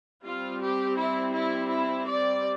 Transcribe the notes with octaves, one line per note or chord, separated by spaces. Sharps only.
G3 C4 F4
G4
E4
E4
E4
D5